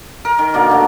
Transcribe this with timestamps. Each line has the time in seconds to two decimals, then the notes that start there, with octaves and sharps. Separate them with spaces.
0.25 A#4
0.39 D#3
0.54 B2 D3 A#3
0.69 D3 A3 F#4